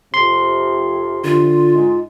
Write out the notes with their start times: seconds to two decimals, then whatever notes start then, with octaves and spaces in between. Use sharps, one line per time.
0.14 F2 C3 C6
1.24 D3 F4
1.73 G#2 G#3